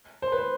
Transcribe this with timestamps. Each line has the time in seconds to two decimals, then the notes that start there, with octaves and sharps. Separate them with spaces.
0.22 C5
0.32 B4
0.37 C5